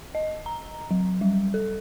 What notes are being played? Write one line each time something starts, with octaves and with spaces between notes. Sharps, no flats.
D#5
A#5
F#3
G3
A4